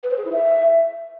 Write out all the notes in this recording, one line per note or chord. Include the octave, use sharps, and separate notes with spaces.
B4
C5
G#4
E4
E5